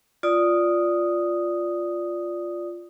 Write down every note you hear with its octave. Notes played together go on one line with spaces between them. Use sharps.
F4 D5 D#6